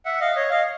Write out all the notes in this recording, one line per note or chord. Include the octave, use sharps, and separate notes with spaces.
E5 F#5
D#5 F5
C#5 D#5
D#5 F5